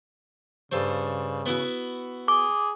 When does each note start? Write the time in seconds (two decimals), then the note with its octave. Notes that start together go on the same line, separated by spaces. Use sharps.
0.72 G2 C#3 A4 C5
1.46 B3 E4 F#4
2.28 G#4 D6